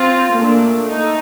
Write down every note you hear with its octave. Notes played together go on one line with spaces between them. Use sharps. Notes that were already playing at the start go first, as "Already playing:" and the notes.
Already playing: C4 F4
A#2 A3 D4
A3 D#4